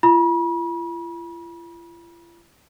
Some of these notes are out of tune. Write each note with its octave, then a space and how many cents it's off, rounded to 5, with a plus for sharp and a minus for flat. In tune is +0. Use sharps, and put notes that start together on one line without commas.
F4 -45 B5 -40